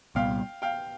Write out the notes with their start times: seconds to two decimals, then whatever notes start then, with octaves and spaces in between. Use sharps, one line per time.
0.15 C2 A#2 G3 B3 F5 G5
0.62 F5 G5